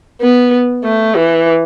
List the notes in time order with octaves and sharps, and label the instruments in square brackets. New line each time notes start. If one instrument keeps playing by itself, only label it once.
[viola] B3
A3
E3